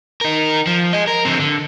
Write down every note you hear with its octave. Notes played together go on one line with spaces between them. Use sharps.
D#4 A#4
F3
G#4 D#5
A#4
D3 C4
D3